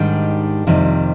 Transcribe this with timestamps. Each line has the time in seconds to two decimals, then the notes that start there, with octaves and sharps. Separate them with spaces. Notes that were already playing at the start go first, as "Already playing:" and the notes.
Already playing: G#2 D#3 G3 D4
0.67 F2 C3 D#3 G3